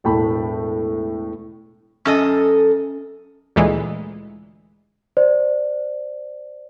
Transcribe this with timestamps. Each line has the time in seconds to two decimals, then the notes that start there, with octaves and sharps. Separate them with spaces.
0.04 E1 A2 G5 A5 B5
2.05 F#2 C#4 A4 D#5
3.56 D2 A#2 E3 G#3
5.17 C5 D5